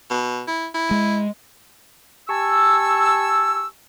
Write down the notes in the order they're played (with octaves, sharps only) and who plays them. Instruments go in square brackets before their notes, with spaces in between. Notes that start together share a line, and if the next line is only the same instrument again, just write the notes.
[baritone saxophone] B2
E4
E4
[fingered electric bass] G#3
[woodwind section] G4 G#5 A5 C#6 E6